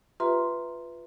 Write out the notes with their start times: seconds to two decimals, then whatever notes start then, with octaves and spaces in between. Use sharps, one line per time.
0.20 F4 G4 B4 E5 A#5 C6